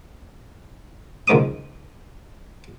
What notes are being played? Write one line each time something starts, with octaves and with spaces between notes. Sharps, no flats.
C#2 D#3 F3 D6 D#6